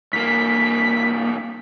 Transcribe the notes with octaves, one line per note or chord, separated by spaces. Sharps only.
C2 A#3 B6